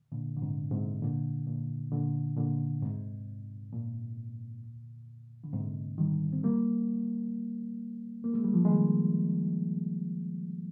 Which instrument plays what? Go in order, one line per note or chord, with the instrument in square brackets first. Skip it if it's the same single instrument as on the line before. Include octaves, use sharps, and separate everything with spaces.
[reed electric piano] A#2 D3
D3
G#2 C3
G#2 C3
A#2 D3
A#2
A#2 D3
A#2 D3
G#2 C3
A#2
D3
G#2 C3
D#3 G3
C4
G3 A#3
A#3
G#3
G3
F3 G#3
G#3
D#3 G3